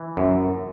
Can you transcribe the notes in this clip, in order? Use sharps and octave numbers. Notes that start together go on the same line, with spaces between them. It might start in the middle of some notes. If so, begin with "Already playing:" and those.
Already playing: E3
F#2